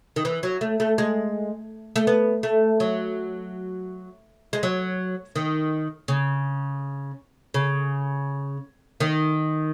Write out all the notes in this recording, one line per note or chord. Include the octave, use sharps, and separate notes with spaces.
D#3
E3
F#3
A3
A3
G#3
A3
B3
A3
F#3
G#3
F#3
D#3
C#3
C#3
D#3